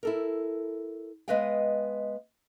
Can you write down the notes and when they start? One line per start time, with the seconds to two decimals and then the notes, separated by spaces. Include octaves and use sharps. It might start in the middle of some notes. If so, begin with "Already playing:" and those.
0.03 E4 A4 A#4
1.28 G#3 B3 B4 D#5 F5 G5